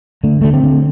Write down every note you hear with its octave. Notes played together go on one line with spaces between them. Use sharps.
D3 A3
D3 A3
C4
D3